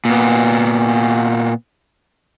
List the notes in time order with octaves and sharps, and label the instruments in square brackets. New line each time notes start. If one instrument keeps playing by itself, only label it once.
[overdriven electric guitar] A#2 B3